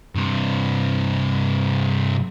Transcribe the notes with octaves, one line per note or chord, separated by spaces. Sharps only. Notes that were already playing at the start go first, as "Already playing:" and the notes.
G2 C3